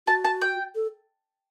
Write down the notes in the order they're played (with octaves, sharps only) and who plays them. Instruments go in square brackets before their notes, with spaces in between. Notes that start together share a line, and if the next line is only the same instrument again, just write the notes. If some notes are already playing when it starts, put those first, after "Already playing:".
[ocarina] F#4 [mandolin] A5
[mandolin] A5
G5
[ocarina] A4